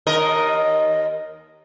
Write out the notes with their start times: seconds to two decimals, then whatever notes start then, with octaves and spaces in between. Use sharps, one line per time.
0.07 D#2 A#4 D#5